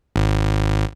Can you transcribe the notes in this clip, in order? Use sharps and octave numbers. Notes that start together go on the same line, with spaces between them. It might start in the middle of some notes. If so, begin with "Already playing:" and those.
G#1